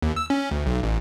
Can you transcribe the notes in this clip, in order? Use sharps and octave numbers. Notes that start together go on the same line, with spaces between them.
D#2
E6
C#4
D2
B1
A1